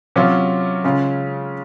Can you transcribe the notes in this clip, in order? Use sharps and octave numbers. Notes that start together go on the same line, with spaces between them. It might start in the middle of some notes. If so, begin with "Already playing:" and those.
C3 F#3 C#4 F4
C#3 G#3 C#4 F4